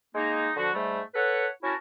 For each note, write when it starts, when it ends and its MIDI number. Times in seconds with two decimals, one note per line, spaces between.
0.15 0.50 56
0.15 0.50 58
0.15 0.50 63
0.56 0.69 50
0.56 0.69 53
0.56 0.69 66
0.74 1.00 44
0.74 1.00 55
0.74 1.00 57
1.15 1.48 69
1.15 1.48 71
1.15 1.48 73
1.15 1.48 78
1.63 1.74 61
1.63 1.74 64
1.63 1.74 66
1.63 1.74 70
1.63 1.74 81